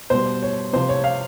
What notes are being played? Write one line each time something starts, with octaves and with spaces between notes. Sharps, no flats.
B2 G3 C5
C#5
C3 F3 C5
C#5
F5